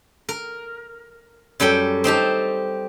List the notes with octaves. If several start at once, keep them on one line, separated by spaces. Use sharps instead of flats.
A#4
F#2 G3 A4 G5
C4 D#4 G4 A5